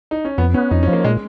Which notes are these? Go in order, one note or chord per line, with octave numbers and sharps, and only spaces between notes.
D#4
C#4
F2 B3
B3 C#4
F2 D#4
C#4
F3
A#3
A#2 G#3